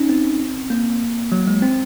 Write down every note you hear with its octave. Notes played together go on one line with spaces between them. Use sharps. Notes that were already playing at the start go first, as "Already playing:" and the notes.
Already playing: C#4 D#4
C4
A#3
F#3
G#3
C4